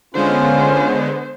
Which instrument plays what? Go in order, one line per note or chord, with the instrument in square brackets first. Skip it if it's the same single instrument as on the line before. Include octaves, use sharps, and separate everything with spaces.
[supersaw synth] D3 G#3 B3 [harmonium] C#4 F4 [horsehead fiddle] C5